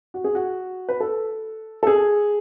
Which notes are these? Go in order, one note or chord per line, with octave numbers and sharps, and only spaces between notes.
F#4
G#4
F#4
B4
A4
A4
G#4